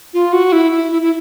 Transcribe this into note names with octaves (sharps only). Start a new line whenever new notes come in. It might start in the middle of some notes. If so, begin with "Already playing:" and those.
F4
F#4
E4
E4
E4
E4